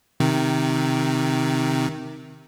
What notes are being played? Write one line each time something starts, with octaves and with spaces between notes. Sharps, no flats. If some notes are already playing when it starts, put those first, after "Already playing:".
C3 D#3